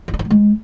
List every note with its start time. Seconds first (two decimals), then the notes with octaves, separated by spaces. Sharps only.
0.08 D#4
0.14 D4
0.19 D#4
0.25 G3
0.31 G#3